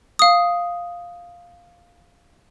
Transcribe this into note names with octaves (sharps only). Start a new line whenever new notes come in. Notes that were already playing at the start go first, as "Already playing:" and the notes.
F5 D#6